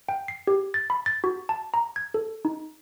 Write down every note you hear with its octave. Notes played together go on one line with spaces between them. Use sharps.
G5
C7
G4
A6
B5
A6
F#4
A5
A#5
G#6
A4
D#4